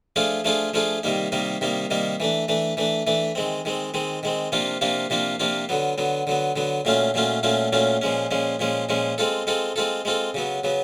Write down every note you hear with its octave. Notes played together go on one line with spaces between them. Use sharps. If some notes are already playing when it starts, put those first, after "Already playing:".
F3 A3 D4 F4 G#4
F3 A3 D4 F4 G#4
F3 A3 D4 F4 G#4
C3 D#3 G3 A#3 D#4
C3 D#3 G3 A#3 D#4
C3 D#3 G3 A#3 D#4
C3 D#3 G3 A#3 D#4
E3 A3 D4
E3 A3 D4
E3 A3 D4
E3 A3 D4
D#3 G#3 C4
D#3 G#3 C4
D#3 G#3 C4
D#3 G#3 C4
C3 F3 A#3 D4 F4
C3 F3 A#3 D4 F4
C3 F3 A#3 D4 F4
C3 F3 A#3 D4 F4
D3 F#3 B3
D3 F#3 B3
D3 F#3 B3
D3 F#3 B3
A#2 F#3 A3 C#4 F4
A#2 F#3 A3 C#4 F4
A#2 F#3 A3 C#4 F4
A#2 F#3 A3 C#4 F4
A#2 F3 G#3 C#4
A#2 F3 G#3 C#4
A#2 F3 G#3 C#4
A#2 F3 G#3 C#4
G#3 C4 F4 A4
G#3 C4 F4 A4
G#3 C4 F4 A4
G#3 C4 F4 A4
C#3 F#3 B3
C#3 F#3 B3